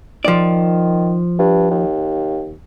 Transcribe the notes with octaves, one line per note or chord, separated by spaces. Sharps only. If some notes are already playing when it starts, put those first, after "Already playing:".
D#3 F3 D5
G2
D#2